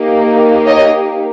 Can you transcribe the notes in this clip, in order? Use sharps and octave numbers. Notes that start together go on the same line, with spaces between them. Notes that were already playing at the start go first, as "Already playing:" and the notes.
Already playing: A#3 D#4 G4
C#5 D#5